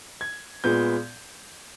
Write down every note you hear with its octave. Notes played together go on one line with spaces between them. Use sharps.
G#6
A#2 G#3 B3 G6